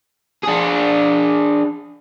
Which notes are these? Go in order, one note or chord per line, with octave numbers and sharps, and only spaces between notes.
D4 G#4